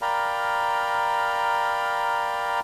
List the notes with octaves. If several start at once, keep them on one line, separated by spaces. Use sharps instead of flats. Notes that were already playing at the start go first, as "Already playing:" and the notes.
A#4 D5 F5 G5 A#5 B5